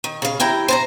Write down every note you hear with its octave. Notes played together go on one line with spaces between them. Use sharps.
D#3
C#3 F5
D#2 E4 G5 A#5
C5 A5 A#5